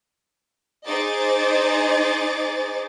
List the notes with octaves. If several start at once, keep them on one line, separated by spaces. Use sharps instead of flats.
D#4 G#4 C5 D#5 D6 A6